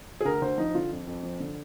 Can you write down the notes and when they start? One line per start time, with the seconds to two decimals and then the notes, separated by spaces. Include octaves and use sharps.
0.21 G#4
0.25 D2 A#4
0.41 D2 C5
0.58 F3 D#4
0.74 D3 F4
0.91 F2
1.07 F2
1.23 F3
1.40 D3